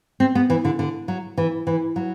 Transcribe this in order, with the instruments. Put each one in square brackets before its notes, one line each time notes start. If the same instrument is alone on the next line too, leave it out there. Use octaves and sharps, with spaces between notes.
[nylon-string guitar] C4
B3
E3
D3
D3
F#3
E3
E3
F#3